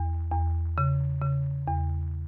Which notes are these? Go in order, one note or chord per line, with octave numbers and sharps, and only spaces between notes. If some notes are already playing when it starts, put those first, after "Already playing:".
Already playing: E2
E2
C#3
C#3
E2